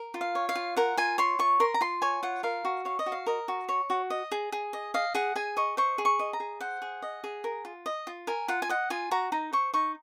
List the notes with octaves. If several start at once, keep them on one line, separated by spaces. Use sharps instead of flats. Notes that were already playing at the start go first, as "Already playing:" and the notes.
Already playing: A#4
F4
F5
C#5
F5
F4
A#4 F#5
F4 G#5
C#5 C6
F4 C#6
A#4 C6
A#5
F4 C6
C#5 G#5
F4 F#5
A#4 F5
F#4
C#5 F5
D#5
F#4
F5
A#4 D#5
F#4
C#5
F#4
D#5
G#4
G#4
D#5
D#5 F5
G#4 F#5
G#4 G#5
D#5 C#6
C5 C#6
G#4
C#6
D#5
A#5
G#4
C5 F#5
G#4
D#5
G#4
A#4
F4
D#5
F4
A#4 G#5
F4 F#5
G#5
D#5 F#5
F4 G#5
F#4 A#5
D#4 A#5
C5 C#6
D#4 C#6